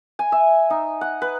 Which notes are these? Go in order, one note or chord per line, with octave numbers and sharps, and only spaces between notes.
G#5
E5
D#4
F#5
B4